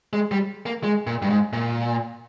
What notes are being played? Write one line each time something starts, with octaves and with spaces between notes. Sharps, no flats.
G#3
G3
A#3
G#3
A#2
G2
G#2
A#2